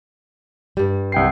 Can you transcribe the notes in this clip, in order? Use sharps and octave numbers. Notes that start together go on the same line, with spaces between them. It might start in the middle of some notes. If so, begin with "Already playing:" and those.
G2 G3
C2 G5 C7